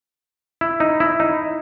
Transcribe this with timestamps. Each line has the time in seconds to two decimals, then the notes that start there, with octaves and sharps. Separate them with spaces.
0.61 E4
0.80 D#4
1.00 E4
1.20 D#4